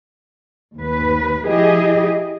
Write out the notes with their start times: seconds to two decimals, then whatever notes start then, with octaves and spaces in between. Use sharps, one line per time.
0.76 D#2 B4
1.45 F3 E4 G4 G#4 D#5